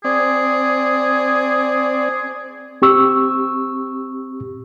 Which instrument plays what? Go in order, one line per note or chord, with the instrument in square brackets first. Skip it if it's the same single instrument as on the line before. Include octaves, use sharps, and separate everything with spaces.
[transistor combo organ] C4 D5 [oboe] G#4
[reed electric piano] C4 G4 C#6 E6